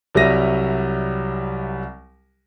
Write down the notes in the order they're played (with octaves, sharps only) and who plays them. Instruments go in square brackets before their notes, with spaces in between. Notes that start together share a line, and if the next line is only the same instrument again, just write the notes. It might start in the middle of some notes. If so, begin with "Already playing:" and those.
[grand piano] C2 F#3 G3 E5 A#6 D#7